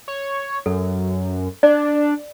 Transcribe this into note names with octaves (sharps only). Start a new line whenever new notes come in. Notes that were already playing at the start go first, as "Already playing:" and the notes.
C#5
F#2 A4
D4 D5